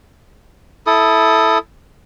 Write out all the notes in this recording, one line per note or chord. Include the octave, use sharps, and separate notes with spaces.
E4 A4 D#6